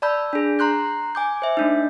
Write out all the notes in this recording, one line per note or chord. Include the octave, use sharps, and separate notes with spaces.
D5 A5 B5 E6 G6
D4 G#4
A#5 C6 F#6 G6
G#5 D6 G6
C5 E5
A3 D4 D#4